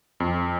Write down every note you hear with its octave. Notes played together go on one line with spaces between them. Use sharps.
F2